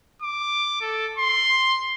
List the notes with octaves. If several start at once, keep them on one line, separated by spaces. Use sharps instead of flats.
D6
A4
C6